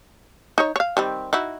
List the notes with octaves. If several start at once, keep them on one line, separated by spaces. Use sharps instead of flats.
D#4 C#5
C#5 F5
D#3 G3 C4
D#4 E4 F#4